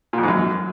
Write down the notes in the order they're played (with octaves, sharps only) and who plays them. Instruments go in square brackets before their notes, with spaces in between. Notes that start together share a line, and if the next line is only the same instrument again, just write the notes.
[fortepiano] A#2
F2
G#2
F#2